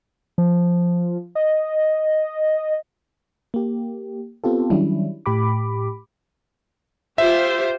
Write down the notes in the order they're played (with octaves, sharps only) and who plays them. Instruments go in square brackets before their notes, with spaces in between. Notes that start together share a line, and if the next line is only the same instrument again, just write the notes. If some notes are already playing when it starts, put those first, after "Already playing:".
[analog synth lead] F3
D#5
[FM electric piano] A#3 G4
B3 C4 F4 G4 A4
D#3 F#3 G3 C#4 D4 E4
A2 G4 B5 D6
[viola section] F4 G4 C5 [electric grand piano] E5